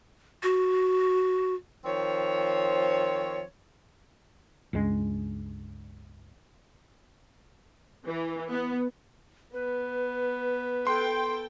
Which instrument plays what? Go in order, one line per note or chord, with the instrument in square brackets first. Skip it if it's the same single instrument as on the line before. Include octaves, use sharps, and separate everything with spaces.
[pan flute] F#4
[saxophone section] D#3 F3 C4 C#5
[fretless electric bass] C#2 G2 G#3
[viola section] E3
B3
[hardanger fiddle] B3 [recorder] B4
[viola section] A4 G5 [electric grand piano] C6